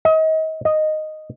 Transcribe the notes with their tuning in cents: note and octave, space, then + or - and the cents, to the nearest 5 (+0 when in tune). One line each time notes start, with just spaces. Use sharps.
D#5 +35
D#5 -5